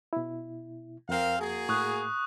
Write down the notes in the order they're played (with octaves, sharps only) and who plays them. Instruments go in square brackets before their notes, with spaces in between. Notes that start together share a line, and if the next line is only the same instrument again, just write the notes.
[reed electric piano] B2 E4
[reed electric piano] F2 [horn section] C4 A#4 F5
[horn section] A#3 F#4 G#4
[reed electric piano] A2 [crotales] C#6 D#6 F#6